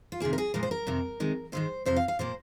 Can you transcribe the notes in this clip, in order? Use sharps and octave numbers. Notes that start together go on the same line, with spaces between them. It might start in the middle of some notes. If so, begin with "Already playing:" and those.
F4
C3 D#3 A#3 G#4
A#4
G#4
A#2 F3 G#3 A#4
C5
A#4
F2 C3 D#3
C3 D#3 G#3
G#2 D#3 G#3 C5
F2 C3 F3 C5
F5
F5
A#2 F3 A#3 C5